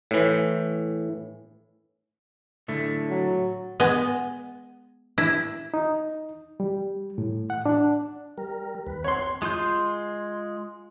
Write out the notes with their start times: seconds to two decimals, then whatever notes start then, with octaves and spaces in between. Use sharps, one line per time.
0.11 A2 E3
2.68 A2 D3 A3
3.09 F#3
3.80 G#3 B3 D#5
5.18 E4
5.74 D#4
6.60 G3
7.18 A2
7.50 F#5
7.66 D4
8.38 G3 A#4
8.87 D#2 B4
9.04 C4 C#5 F#5 C6
9.42 G#3 F4 C6 G6